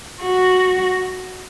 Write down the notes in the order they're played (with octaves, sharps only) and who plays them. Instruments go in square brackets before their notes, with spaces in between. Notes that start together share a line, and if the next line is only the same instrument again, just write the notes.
[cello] F#4